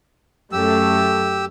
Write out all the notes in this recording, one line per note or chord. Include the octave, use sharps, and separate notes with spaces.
F#2 A3 G4 E6